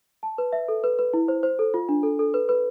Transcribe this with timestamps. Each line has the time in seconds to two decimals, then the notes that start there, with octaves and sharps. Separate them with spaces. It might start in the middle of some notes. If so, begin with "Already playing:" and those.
0.23 A5
0.38 B4
0.53 E5
0.68 A4
0.84 B4
0.99 B4
1.13 E4
1.28 C5
1.43 C5
1.59 A4
1.74 F4
1.89 D4
2.03 A4
2.19 A4
2.34 B4
2.49 B4